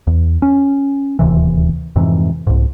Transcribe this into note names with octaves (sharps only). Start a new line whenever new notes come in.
E2
C#4
D1 D#2 C3 E3
F2 G#2 C3 E3
C2 G#2